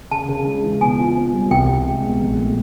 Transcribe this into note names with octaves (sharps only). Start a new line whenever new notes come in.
C#3 A5
C#3
G#3
E3
B2 G#5
F4
C4
G3
C2 G5
C2
G#3
B2
A#1
A3